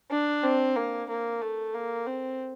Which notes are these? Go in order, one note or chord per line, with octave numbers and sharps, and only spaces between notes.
D4
C4
A#3
A#3
A3
A#3
C4